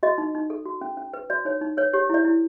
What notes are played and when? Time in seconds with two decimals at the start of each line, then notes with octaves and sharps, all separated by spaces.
0.03 F#4 D#5
0.18 D#4
0.35 D#4
0.50 A4
0.66 F#4
0.81 C#4
0.97 C#4
1.14 B4
1.30 F#4 D5
1.45 D#4 C#5
1.61 D#4
1.77 B4 C#5
1.93 G4 C#5
2.10 E4 D5
2.25 E4